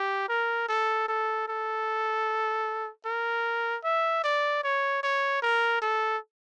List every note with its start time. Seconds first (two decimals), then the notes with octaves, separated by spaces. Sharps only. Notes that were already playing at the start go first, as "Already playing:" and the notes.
Already playing: G4
0.29 A#4
0.69 A4
1.08 A4
1.48 A4
3.06 A#4
3.84 E5
4.24 D5
4.64 C#5
5.03 C#5
5.42 A#4
5.82 A4